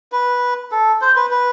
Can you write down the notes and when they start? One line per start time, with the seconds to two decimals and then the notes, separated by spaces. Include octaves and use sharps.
0.12 B4
0.71 A4
1.01 C5
1.16 B4
1.31 B4